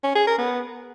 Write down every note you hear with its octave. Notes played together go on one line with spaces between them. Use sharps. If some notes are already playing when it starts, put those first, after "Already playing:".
C#4
G#4
A#4
B3